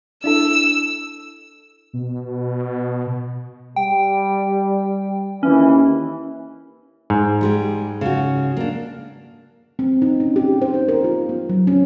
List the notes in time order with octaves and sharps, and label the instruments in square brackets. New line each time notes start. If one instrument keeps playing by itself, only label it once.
[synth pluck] D4 E4 A4 [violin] E6
[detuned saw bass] B2
[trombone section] G3 [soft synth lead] G5
[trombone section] D#2 E3 [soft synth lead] C#4
[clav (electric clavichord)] G#2
[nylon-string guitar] G3 G#3 G4
C#3 F#4
A#3 D4
[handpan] C4
D#4
C#4
G4
C5
D#4
A#4
F4
B3
F#3
C#4